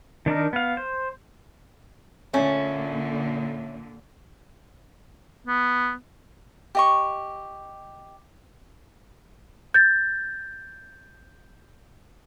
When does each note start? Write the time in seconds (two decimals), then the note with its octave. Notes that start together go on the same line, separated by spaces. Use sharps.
0.26 D#3 D4 D#4 A#4
0.53 B3 F5
0.77 C5
2.33 A#2 D3 A3 C#4
5.47 B3
6.75 G4 D#5 C#6
9.74 G6 A6